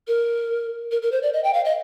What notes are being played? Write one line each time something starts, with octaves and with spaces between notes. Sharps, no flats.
A#4
A#4
A#4
C5
D5
D#5
G5
F5
D#5